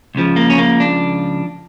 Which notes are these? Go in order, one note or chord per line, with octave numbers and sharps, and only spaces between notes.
C#2 C#3 F3
A#3
C#4
A#3
D4